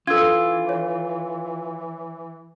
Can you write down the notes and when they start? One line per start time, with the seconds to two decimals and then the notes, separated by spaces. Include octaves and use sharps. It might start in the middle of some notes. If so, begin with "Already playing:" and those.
0.07 E3 D4 F4 A4 E6 G#6
0.69 C#5